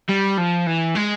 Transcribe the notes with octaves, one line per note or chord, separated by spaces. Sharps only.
G3
F3
E3
G#3